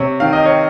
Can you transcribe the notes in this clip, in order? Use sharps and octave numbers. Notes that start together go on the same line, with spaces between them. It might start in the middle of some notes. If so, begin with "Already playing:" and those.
Already playing: C3 C#5
D#3 F5
D#5
C#5